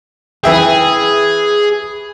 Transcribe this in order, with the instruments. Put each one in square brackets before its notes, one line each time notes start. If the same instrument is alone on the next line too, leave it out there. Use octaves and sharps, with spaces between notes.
[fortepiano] E3 E5 G5 [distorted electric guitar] G#4